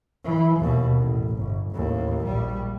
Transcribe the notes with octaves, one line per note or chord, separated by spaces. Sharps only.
E3
D#2 B2
A1
G1
A1 D#2
A#1 G3